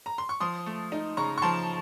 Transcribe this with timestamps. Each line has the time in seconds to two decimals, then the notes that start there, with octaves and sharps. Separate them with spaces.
0.06 A#5
0.18 C6
0.29 C#6
0.40 F3 C6 D#6
0.66 A3
0.92 D#4
1.17 C#3 A#5 C#6
1.38 C#6
1.42 F3 A5 C6